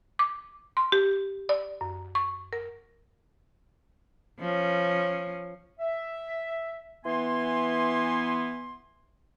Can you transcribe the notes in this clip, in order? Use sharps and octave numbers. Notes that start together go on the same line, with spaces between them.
D6
C6
G4
D5
F#2
C#6
A#4
F3 C#4
E5
E3 B3 G#5 C6